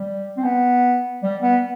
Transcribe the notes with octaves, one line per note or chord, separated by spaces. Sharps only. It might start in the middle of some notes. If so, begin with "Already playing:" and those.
Already playing: G3
C4
B3
G3
B3